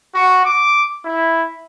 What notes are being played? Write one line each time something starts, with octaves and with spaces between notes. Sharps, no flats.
F#4
D6
E4